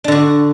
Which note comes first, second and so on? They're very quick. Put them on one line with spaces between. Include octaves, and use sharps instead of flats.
D4 D3 F#4